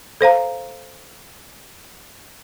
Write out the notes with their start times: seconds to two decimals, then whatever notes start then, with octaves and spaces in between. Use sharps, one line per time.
0.21 A4 C5 F5 A#5